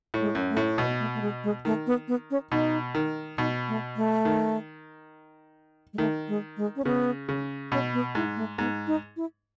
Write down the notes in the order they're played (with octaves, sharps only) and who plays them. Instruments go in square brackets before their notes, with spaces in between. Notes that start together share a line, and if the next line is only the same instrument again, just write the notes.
[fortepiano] A2
[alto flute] G#3
[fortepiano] F#2
[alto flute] A3
[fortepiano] A2
[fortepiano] B2 [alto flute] B3
[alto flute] A3
A3
G#3
G#3
[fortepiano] D#3 [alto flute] A3
[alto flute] B3
B3
C#4
[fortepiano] B2 [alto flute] D#4
[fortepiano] D#3
[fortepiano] B2 [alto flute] D#4
[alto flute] A3
A3
[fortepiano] D#3
[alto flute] G#3
[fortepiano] D#3 [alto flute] A3
[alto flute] G#3
G#3
C#4
[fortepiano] C#3 [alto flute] B3
[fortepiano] C#3
[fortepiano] B2 [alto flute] C#4
[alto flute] B3
[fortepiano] G#2 [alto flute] E4
[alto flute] A3
[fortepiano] G#2 [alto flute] B3
[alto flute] D#4
E4